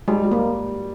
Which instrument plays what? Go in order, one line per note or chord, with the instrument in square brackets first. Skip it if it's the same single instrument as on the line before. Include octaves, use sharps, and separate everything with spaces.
[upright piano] G3 [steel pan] G#3
[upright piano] G3
[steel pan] A#3